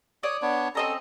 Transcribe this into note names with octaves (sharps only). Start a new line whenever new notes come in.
C#5 D5 D#6
B3 D4 C#5
C4 C#4 A4 D#5 A#5